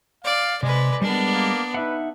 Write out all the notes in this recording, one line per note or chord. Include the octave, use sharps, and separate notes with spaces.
D5 F5
C3 G#3 B4 D5
G3 G#3 B3 D4 A#4
A#3
D#4 B4 E5 F#5